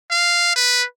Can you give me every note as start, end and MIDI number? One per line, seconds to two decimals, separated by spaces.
0.11 0.52 77
0.56 0.84 71